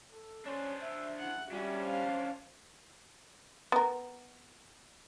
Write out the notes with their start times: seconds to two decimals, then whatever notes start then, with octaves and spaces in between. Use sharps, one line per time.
0.11 A4
0.45 C#4 D4 C5
0.81 E5
1.19 E4 F#5
1.52 G3 C#4 D4 F#4 E5
1.81 C5 F5
3.72 B3 A#4